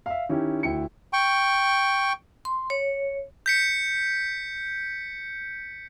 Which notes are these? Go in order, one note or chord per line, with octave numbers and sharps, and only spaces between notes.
E5 F5
D#3 C#4 E4 G4
D2 E4 G5 C#7
G5 C#6
C6
C#5
G6 B6 C#7